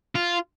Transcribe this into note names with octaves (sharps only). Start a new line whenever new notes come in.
F4